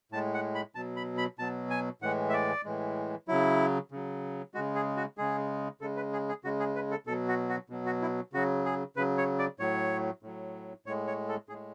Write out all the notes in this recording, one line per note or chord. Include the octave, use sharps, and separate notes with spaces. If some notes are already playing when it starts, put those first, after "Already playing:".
A2 G#3 A5
F#5
B5
B2 F#3 A5
B5
B5
B2 F#3 A5
G#5
A2 E3 G#3 F#5
E5
D5
A2 E3 G#3
C#3 F#3 E4
C#3 F#3
C#3 G#3 F#4
G#4
F#4
C#3 G#3 G#4
C#3 G#3 A4
B4
G#4
G#4
C#3 G#3 F#4
G#4
B4
A4
B2 F#3 A4
F#4
F#4
B2 F#3
F#4
E4
C#3 F#3 F#4
G#4
C#3 F#3 B4
C#5
D5
A2 F#3 C#5
A2 F#3
A2 G#3 C#5
C#5
A4
A2 G#3 G#4